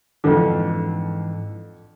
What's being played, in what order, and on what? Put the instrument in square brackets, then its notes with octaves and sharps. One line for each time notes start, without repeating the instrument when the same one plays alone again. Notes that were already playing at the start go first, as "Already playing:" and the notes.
[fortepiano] F2 D3 [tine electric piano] G#2 E3